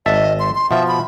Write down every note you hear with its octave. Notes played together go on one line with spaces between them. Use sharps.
G#1 D#5 E5 A5
C6
C6
B2 F3 E5
B5